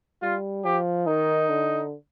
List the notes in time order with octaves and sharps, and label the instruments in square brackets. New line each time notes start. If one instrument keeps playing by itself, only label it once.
[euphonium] G3 [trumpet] F4
[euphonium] F3 [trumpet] G4
[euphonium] D#3 [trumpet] D#4
[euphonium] D3